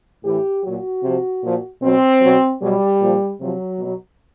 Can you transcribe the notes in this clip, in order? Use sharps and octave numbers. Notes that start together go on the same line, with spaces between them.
A2 E3 G4
A#2 F#3 F#4
C3 F3
A#2 F3
B2 F#3 C4
B2 F#3
B2 F#3 G3
A#2 F3
C3 F3 F#3
B2 F#3